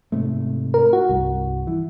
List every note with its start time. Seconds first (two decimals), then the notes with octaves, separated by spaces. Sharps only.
0.12 G#2 C3 A3
0.74 A#4
0.93 F#4
1.09 C2 G2
1.67 E3